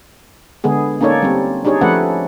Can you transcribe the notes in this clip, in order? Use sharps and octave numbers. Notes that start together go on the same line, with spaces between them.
D3 G#3 B3 G#4
A#3 C#4 D#4 A4 C#5 D5
G3 C4
D4 D#4 G4 G#4 C#5 D5
F3 A3 C#4 A4 B4 F#5